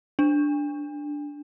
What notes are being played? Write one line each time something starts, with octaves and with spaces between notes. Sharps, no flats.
D4